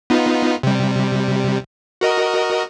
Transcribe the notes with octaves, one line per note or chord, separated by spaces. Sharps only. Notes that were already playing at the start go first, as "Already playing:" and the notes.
B3 D#4 F4
C3 G3
F#4 A#4 D#5